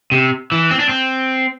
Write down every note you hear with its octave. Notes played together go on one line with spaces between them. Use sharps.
C3
E3
C4
D4
C4